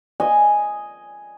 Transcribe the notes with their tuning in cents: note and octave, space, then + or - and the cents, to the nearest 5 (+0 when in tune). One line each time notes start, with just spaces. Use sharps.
D#5 +0 G#5 +0